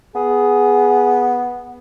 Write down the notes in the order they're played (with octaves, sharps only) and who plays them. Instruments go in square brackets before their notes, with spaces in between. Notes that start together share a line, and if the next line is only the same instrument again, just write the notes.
[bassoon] B3 [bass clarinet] G#4